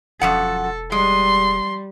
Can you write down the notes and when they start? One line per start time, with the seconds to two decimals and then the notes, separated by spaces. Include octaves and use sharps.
0.21 E1 F#2 F3 A4 F#5
0.92 G3 G#3 C6